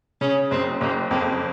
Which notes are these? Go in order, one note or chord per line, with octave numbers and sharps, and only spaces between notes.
C#3 C#4
F#1 C4
F#1 A#3
F2 A#3